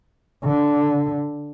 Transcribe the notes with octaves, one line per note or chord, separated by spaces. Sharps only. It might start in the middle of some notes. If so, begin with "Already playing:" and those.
D3